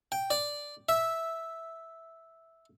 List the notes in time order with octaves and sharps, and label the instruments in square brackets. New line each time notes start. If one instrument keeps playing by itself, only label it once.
[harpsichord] G5
D5
E5